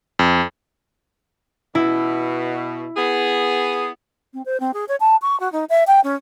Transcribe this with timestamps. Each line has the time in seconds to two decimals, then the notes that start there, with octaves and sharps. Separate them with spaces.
0.19 F2
1.75 B2 E4
2.97 B3 G#4
4.34 C4
4.46 C5
4.60 C4
4.74 G#4
4.89 C#5
5.00 A5
5.22 C#6
5.40 F#4
5.52 D#4
5.70 E5
5.87 G5
6.04 C#4